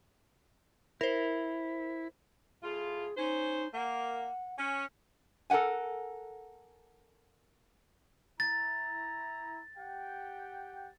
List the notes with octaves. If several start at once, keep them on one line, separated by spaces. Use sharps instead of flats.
E4 A#4 C5
A2 F4 G#4
C#4 D#4 C5
A#3 F#5
C#4
A4 A#4 C5 F#5 G#5
E4 A#5 A6
G4 F#5 G5